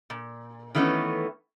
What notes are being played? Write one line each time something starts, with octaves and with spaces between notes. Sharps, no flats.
A#2
D#3 E3 A3 B3 C#4